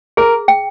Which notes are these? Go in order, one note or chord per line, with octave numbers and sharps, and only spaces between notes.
G#4 A#4
G5